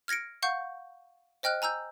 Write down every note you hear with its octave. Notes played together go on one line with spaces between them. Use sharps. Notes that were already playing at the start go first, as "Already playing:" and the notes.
F6 G#6 A#6 C#7 D7
F5 F#5 C#6 G6
C5 D#5 G5 F6 F#6
G#5 A#5 E6 G6